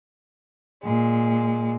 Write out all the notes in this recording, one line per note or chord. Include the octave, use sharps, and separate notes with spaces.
A#2 G#3